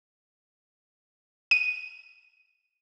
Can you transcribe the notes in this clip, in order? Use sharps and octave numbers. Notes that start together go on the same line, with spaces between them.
D#7